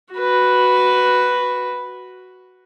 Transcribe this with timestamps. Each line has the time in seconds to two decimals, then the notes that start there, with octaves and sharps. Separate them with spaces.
0.14 F#4 B4